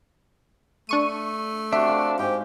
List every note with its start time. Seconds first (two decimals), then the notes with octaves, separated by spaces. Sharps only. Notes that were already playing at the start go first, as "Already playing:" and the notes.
0.89 A3 D4 C#6 D#7
1.72 C4 D4 F#4 G4 E5
1.89 F5
2.19 G#2 G4 G#5